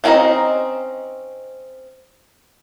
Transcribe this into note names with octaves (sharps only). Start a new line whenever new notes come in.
F3 C4 C#4 D#4 D#5